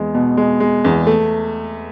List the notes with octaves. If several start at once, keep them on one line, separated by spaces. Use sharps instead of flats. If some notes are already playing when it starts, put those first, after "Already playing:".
Already playing: E2 G#3
B2
G#3
G#3
E2
A3